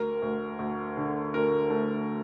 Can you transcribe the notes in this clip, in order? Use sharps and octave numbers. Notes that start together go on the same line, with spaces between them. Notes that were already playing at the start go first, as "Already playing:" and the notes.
Already playing: D2 A#4
D2
D2
D3
D2 A#4
A3